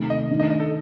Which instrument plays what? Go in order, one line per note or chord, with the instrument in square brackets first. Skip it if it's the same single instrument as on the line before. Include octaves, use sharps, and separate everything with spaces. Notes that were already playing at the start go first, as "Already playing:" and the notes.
Already playing: [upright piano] C3 D#3 A3
[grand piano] D#5
[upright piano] D#3 A3 D4
[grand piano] D#5
D#5
A4